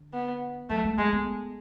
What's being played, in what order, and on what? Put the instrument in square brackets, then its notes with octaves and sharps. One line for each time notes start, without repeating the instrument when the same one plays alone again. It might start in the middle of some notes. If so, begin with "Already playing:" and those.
Already playing: [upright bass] D3
[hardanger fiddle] B3
[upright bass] F#3 [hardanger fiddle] A3
[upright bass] G#3
[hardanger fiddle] G#3 [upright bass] A3
[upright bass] B3